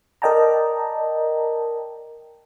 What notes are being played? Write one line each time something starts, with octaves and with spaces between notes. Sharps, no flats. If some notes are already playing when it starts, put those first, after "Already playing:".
A#4 D5 D#5 G5 A5 A#5